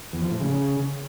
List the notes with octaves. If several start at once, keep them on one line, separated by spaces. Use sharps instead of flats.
E2
F3
A2
C#3